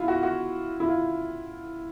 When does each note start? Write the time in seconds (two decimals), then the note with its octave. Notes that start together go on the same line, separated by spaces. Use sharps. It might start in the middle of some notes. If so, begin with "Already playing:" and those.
Already playing: E4 F4
0.08 F#4
0.23 F#4
0.80 E4
0.88 F4